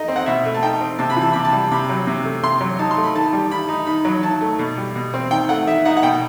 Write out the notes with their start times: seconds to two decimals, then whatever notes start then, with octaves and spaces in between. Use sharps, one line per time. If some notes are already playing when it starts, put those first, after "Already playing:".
Already playing: A3 D#4 D#5
0.08 C4
0.16 F#5
0.26 B2 E5
0.45 A3
0.54 A5
0.63 D#4 G5
0.81 C4
0.99 C3 A5
1.10 B5
1.16 E3
1.22 A5
1.33 C3 B5
1.45 A5
1.52 G3
1.71 C3 B5
1.89 F#3
2.07 C3
2.24 A3
2.43 C3 C6
2.61 F#3
2.79 D#4 A5
2.91 C6
2.97 A3
3.04 B5
3.15 D#3 A5
3.33 G3
3.51 D#3 B5
3.68 D#4
3.87 D#3 B5
4.05 F#3
4.23 D#3 A5
4.41 A3
4.59 B2
4.78 G3
4.96 B2
5.14 C4
5.31 D#3 G5
5.49 A3 F#5
5.67 D#3 E5
5.85 D#4 F#5
5.97 F#5
6.03 B2 G5